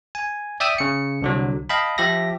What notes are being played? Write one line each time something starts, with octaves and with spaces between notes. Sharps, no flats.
G#5
D5 E5 G5 D#6 E6
C#3 C#7
C2 D3 F#3
D#5 F5 G5 A5 B5
F3 G4 E5 A#6